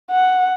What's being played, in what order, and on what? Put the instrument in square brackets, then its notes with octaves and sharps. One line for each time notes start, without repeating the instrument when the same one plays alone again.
[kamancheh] F#5